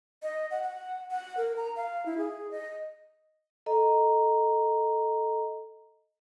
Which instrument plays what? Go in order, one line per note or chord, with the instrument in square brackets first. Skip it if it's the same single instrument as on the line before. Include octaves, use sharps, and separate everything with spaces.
[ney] D#5
F#5
F#5
F#5
A#4
A#5
F5
E4
G#4
D#5
[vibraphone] A4 D#5 A#5